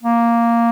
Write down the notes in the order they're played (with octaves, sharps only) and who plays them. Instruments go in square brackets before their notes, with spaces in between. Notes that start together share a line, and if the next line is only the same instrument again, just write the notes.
[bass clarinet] A#3